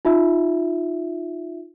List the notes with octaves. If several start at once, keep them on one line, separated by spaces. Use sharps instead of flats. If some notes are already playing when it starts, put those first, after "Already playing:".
D#4 F4 E5